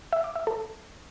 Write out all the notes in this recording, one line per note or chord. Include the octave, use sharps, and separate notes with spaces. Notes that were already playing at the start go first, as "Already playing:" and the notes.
E5
D6
E5
A4